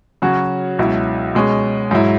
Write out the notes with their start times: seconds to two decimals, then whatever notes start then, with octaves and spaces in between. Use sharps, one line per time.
0.22 C#3 F#3 C#4 F#4
0.79 C#2 B2 F#3 E4
1.35 B2 G#3 C#4
1.91 G#2 F#3 E4